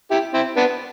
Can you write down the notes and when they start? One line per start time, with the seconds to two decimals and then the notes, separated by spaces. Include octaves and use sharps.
0.11 E4 G4
0.34 C4 E4
0.57 B3 D4